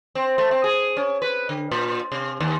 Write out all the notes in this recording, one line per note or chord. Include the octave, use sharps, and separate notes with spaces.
C4
A3
C4
G#4
C#4
B4
D3
A#2
C3
D#2